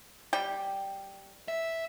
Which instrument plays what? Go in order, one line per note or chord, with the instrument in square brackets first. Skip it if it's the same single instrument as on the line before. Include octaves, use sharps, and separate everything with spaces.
[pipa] G3 G5
[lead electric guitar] E5